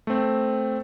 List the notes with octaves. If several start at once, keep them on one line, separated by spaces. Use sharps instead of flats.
A3 C4